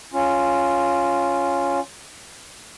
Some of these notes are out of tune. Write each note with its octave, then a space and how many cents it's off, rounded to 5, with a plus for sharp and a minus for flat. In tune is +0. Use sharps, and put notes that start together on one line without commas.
C#4 +0 F4 +0